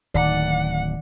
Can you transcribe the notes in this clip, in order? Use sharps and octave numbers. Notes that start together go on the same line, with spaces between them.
D1 D#3 D5 F#5